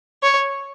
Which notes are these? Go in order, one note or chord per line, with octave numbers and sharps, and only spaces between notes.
C#5